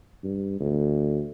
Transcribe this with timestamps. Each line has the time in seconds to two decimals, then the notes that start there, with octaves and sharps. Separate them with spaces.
0.24 G2
0.60 D2